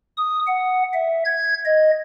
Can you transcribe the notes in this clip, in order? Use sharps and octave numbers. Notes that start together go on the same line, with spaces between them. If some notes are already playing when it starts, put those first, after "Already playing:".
D#6
F#5
E5
G#6
D#5